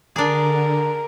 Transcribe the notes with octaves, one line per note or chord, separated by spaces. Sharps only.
D3 D4 G#4 A#4